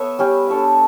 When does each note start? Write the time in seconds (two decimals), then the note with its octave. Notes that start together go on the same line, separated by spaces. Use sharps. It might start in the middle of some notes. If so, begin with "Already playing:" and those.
Already playing: B3 A4 B4 C#5 E5
0.19 G3 C#4 G4
0.48 D4 A4 C#5 E5